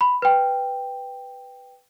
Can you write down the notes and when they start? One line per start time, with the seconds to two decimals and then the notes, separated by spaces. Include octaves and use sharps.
0.01 B5
0.22 B4 G5